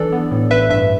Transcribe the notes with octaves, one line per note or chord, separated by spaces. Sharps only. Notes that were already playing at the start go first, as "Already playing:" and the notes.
Already playing: B1 E3 D4 A4 D5
B3
A2
A1 B4 E5
G2 B4 E5